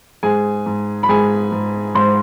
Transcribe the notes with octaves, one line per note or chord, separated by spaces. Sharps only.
G#2 G#4 G#5
G#2
B5
G#2 G#4 G#5
G#2
G#2 C5 C6